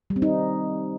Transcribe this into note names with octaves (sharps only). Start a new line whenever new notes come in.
G3
C4
D#4